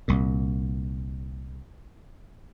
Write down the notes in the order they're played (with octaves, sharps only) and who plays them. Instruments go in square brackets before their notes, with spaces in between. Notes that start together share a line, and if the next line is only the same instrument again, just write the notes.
[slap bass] C2 A#2